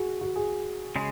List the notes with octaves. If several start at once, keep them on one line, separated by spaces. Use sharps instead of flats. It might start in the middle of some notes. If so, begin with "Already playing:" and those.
Already playing: F#4 G#4
F#4
G#4
C#3 G#3